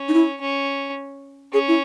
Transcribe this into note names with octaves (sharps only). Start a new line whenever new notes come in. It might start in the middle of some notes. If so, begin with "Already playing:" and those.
Already playing: C#4
D#4
E4
C#4
C#4 G#4
E4